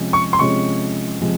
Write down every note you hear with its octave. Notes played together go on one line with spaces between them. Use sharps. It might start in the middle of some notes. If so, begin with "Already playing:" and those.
Already playing: C3 F3 G#3 C#4
C#6
C6
C3 F3 G#3 C#4 C#6
C3 F3 G#3